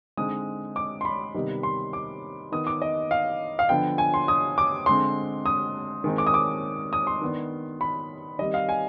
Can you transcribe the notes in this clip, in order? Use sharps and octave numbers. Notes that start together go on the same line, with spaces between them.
D3 G#3 C4 D#4 D#6
D6
C6
B5
C3 D#3 G3 B3 D#4
C6
D6
D#3 B3 D#4 D#6
D6
D#5
F5
F5
D3 F3 B3 G5
G#5
C6
D#6
D6
D3 G#3 C4 C6
D#6
D#3 G#3 C4 D#4
D6
D#6
D6
D#6
C6
D#3 B3 D4
B5
D#3 G3 C4 D#5
F5
G#5